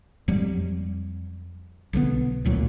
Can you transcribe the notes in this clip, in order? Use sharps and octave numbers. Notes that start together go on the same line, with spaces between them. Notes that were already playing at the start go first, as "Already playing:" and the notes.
F2 F#3 G3
B1 D3 F3 B3
A1 D2 A#2 F#3